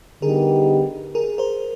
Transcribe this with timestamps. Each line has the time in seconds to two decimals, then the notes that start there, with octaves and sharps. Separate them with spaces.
0.22 D3 G3 B3 D#4 G4 G#4 A#4
1.15 G#4 A#4
1.38 A#4 C5